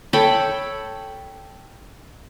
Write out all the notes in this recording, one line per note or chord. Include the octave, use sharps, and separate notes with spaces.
A4 C#5 G5 B5